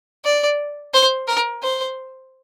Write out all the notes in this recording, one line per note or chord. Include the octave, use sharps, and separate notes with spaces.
D5
C5
A#4
C5